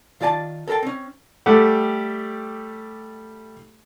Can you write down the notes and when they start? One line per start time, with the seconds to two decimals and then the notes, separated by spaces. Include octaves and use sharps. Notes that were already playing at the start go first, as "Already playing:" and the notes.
0.21 D#3 F4 D5 G#5 A5
0.68 A4 A#4 C5 G5 A5
0.83 C4 C#4
1.46 G3 A3 G4 F#5